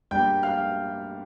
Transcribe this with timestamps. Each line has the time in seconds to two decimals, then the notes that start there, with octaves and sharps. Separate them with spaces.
0.11 G2 G3 A#3 G5 G6
0.43 F5 F6